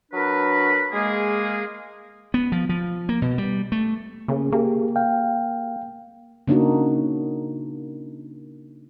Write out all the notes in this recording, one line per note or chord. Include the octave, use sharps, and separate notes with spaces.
F#3 D4 A#4 B4
G#3 A#3 G#4
B3
F3
F3
A#3
B2
G3
A3
C#3 A#3 G#4
A#3 G4 G#4
F5 G5
C#3 A#3 D4 D#4 F#4